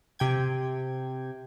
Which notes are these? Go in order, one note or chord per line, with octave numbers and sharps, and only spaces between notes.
C3 G5 G#6